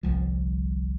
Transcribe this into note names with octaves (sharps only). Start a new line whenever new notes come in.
G1 C2 F3